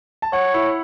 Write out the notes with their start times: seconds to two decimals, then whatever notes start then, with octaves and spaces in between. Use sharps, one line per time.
0.22 A5
0.33 C#5 F#5
0.54 E4